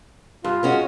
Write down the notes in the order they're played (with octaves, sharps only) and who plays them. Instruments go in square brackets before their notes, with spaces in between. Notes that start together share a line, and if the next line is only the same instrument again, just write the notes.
[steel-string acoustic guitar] G2 [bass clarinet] F4
[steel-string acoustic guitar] G#3 C#4 F#4